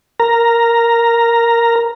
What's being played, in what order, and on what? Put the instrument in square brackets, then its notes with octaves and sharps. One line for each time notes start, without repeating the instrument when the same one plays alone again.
[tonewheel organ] A#4 A#5